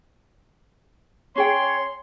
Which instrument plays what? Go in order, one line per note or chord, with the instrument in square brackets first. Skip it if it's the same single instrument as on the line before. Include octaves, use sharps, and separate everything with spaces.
[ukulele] C#4 G#4 G5 [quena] C#5 [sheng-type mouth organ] C6